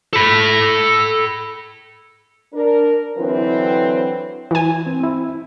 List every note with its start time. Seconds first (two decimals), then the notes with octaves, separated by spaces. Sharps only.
0.13 A4 B5
2.53 D4 A#4
3.16 D3 E3 F#3 C4 E4 B4
4.51 E3 G#5
4.86 C4
5.00 C4 E4